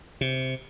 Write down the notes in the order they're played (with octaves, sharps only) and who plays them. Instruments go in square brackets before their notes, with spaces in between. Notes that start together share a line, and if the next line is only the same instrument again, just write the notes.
[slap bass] C3